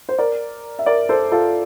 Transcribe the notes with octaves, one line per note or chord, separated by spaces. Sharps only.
C5
A#4 D5
E5
A#4 D5
A4 C5
F4 A4